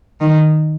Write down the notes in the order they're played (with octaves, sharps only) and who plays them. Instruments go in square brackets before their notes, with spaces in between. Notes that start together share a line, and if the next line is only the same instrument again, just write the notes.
[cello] D#3